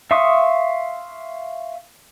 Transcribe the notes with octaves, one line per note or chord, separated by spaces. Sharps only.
E5 F5 C6 C#6 D#6